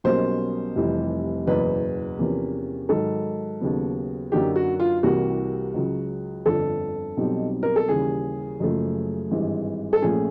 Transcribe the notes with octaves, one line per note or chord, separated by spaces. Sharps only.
B1 B2 G3 A#3 C#4 C5
F1 F2 C3 E3 G3
F#1 E2 B2 B4
E2 C3 F3 A#3 C#4
G#2 D#3 F#3 A4
D#2 C#3 F#3 B3
F#2 D3 F#3 A#3 D#4 G4
F#4
F4
C2 C3 E3 G3 A#3 F#4
C#2 C#3 F#3
G1 F2 D3 A4
B1 B2 G3 C4 D#4
A#4
A4
D#2 C#3 E3 G3 G#4
F#1 F#2 C#3 F3 A3
G#1 G2 E3 G#3
A4
A#1 A#2 F3 A3 C#4 G#4